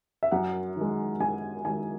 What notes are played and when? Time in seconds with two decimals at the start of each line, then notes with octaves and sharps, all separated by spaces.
0.23 E5
0.31 F#2 F#5
0.76 D#3 G#3
1.20 F#2 G#5
1.64 D#3 G#3 G#5